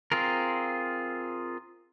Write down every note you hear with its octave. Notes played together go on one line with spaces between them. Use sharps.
C4 F4 G#4 A#4